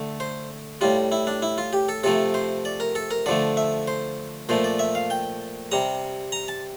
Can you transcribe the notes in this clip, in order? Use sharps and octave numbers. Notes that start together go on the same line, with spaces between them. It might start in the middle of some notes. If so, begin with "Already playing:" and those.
Already playing: D3 A3
C5
A2 G3 F4
E4
D4
E4
F4
G4
A4
C3 F3 A3 A4
C5
D5
A#4
A4
A#4
D3 F3 A3 D5
E5
C5
A#2 F3 A3 C5
D5
E5
F5
G5
C3 G3 A#5
A#5
A5